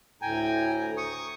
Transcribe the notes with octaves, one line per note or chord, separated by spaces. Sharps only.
D2 A2 G5 G#5 A#5
C#6 D#6